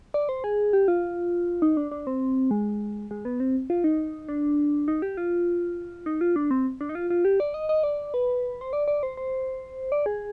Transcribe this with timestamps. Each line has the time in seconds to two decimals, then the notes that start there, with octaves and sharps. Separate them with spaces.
0.14 D5
0.29 C5
0.44 G#4
0.73 G4
0.88 F4
1.62 D#4
1.77 D4
1.91 D4
2.07 C4
2.51 G#3
3.11 G#3
3.25 B3
3.40 C4
3.70 F4
3.84 D#4
4.29 D4
4.88 D#4
5.02 G4
5.17 F4
6.06 D#4
6.21 F4
6.36 D4
6.51 C4
6.81 D4
6.89 D#4
6.95 F4
7.10 F4
7.25 G4
7.40 D5
7.54 D#5
7.69 D#5
7.83 D5
8.14 B4
8.61 C5
8.73 D5
8.88 D5
9.03 C5
9.17 C5
9.92 D5
10.06 G#4